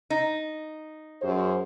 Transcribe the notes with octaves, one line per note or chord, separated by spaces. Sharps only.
D#4
F#2 G#4 C5